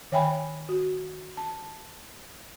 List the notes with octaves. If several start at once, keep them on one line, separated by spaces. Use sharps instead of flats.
D#3 C#5 E5 G5 G#5 B5
F#4
A5